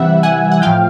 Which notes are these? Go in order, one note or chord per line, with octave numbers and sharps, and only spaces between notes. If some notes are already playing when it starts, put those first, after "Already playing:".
Already playing: C3 E3 G3 E5 F#5
F#5 G#5
F#5
A2 F3 F5 G5